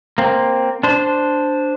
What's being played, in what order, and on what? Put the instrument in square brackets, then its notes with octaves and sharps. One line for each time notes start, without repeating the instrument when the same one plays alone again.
[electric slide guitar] A#3 C4
D4 C5